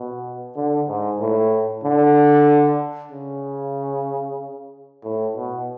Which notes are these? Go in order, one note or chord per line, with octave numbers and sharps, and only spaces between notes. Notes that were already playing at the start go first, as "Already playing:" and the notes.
Already playing: B2
D3
G#2
A2
D3
C#3
A2
B2